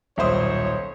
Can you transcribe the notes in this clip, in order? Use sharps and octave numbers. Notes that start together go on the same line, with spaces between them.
D#1 B1 C5 C#5 E5 D#6